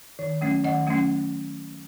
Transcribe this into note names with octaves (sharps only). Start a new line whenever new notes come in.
D#3
F#3 A3 C#4
D#3 D#5 F#5
F#3 A3 C#4